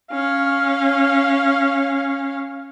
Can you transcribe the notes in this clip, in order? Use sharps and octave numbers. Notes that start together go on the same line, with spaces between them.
C#4 F5